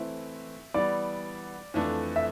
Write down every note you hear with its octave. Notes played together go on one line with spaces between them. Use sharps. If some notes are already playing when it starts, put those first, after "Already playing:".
Already playing: E3 A3 C4 E4 E5
E3 G3 B3 D5
F2 E3 A3 D4
E5